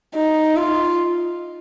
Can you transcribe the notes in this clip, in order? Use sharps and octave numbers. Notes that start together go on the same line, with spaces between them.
D#4
F4